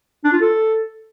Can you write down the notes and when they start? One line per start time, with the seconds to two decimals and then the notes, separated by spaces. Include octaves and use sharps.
0.24 D4
0.33 F4
0.41 A4